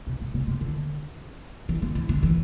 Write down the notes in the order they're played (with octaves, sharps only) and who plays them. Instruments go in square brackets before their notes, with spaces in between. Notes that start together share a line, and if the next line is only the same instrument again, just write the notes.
[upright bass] B2
C3
C3
C3
D3
E3
D3
E3
D3
E3